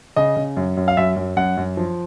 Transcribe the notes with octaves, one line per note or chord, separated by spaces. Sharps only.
C#3 D#5
C#3
F#2
F#2
F5
F#2 E5
F#2
F#2 F#5
F#2
F3